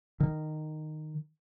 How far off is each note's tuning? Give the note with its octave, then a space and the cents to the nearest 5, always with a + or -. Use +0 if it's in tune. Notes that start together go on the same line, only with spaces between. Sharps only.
D#3 -10